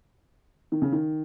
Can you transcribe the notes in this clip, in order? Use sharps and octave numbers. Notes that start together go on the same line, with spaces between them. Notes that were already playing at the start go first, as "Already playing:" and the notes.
D#3
C#3
D#3